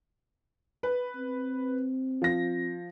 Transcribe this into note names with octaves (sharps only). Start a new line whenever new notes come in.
B4
C4
F3 A#6